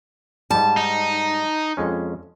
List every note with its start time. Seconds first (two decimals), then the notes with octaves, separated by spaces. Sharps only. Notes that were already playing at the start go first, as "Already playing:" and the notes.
0.51 G#2 G3 A5
0.77 D#4
1.77 F2 G#3 C#4